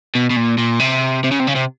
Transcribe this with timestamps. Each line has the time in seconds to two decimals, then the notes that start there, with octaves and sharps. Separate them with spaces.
0.15 B2
0.30 B2
0.36 A#2
0.58 A#2
0.80 C3
1.24 C3
1.31 C#3
1.40 C3
1.47 C#3
1.55 C3